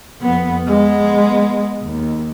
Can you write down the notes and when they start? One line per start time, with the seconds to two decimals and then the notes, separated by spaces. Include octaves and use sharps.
0.22 F2 B3
0.68 G#3 B3
1.83 D#2